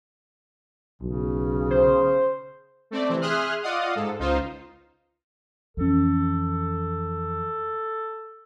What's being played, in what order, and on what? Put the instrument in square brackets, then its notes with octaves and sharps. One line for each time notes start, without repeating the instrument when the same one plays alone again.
[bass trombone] B1 [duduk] C#3
[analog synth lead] C5
[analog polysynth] A3 C4 D5
C3 E3 C4
G#4 E5 C6 D#6 F6 F#6
F4 D5 D#5 F5 F#5 D#6
G#2 A4
C#2 D#4 F4 C5
[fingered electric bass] F2 E3 C#4 [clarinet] A4